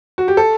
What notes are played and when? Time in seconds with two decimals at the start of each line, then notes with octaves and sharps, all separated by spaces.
0.18 F#4
0.28 G4
0.37 A4